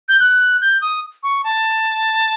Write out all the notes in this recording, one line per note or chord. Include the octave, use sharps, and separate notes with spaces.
G6
F#6
G6
D#6
C#6
A5